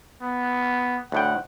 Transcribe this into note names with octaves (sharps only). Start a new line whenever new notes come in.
B3
D2 A2 F#5 G5